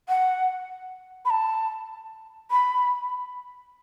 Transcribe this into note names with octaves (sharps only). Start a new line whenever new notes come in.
F#5
B5
A5
B5